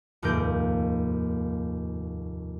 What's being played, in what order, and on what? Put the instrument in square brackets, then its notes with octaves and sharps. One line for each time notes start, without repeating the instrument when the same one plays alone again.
[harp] F1 D#2 G#2 A#3 G6 D7